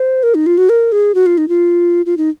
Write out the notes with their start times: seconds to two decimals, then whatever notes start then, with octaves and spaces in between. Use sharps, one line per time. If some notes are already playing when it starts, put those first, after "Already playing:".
Already playing: C5
0.23 A#4
0.35 D#4
0.46 F4
0.58 F#4
0.69 A#4
0.92 G#4
1.15 F#4
1.26 F4
1.38 D#4
1.49 F4
2.06 F4
2.17 D#4